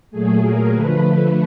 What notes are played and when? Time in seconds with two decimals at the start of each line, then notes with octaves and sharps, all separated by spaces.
0.11 A#2 F#3 A3 G#4
0.42 A#4
0.72 D3 F3 A3 B4
1.03 B4